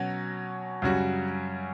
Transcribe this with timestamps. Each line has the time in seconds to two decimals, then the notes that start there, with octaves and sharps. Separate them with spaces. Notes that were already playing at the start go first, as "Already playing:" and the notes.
Already playing: B2 F#3 C#4
0.82 F#2 C#3 G3 C#4 F#4